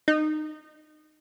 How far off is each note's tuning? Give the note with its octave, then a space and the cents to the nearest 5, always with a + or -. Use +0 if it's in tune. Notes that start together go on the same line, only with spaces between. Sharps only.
D#4 -20